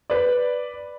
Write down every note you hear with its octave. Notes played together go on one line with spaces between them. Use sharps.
B4 D5